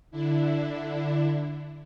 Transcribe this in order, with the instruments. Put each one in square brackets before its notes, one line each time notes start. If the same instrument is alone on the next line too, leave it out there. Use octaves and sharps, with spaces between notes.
[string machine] D3 D4 E4